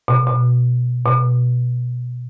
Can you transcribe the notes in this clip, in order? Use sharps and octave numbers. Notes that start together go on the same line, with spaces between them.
B2
B2
B2